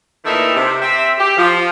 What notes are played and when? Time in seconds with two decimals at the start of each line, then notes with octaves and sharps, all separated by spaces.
0.25 A#2 D#3 E3 A3 D#4 E4
0.55 C3
0.81 C4 E5
1.18 G4
1.37 F3